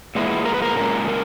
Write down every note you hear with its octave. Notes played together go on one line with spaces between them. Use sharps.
A#2 G#3 B3 E4
A#4
B4
A#4
A#2 G#3 C#4 A#4
A#4